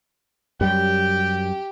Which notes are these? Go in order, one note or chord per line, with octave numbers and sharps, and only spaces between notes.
F#2 G3 G4 G5